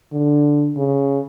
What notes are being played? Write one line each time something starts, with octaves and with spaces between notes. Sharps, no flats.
D3
C#3